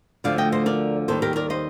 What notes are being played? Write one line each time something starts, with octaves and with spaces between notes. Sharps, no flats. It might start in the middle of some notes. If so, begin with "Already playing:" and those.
D2 D3 F3 A3 D5 F5
D#5 G5
C5 D#5
A#4 D5
D#2 D#3 G3 A4 C5
G4 A#4
A#4 D5
C5 D#5